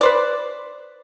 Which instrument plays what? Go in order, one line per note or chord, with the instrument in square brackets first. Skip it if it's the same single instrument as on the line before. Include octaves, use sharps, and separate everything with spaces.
[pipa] B4 C5 D5